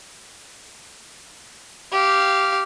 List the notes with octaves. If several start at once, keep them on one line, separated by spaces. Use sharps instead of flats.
G4 F5